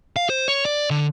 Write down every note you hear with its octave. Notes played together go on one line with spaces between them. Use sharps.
F5
C5
C#5
D5
D3